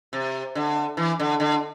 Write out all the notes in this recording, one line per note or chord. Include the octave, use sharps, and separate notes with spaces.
C3
D3
E3
D3
D3